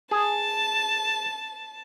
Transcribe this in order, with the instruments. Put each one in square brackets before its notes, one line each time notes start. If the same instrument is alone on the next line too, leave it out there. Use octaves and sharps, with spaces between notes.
[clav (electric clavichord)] G#4 [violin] A5